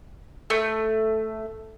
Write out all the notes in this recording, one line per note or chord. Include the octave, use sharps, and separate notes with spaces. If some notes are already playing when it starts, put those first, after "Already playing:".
A3